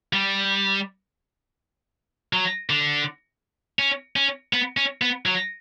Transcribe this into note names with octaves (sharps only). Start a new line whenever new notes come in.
G3
F#3
D3
C#4
C#4
B3
C#4
B3
F#3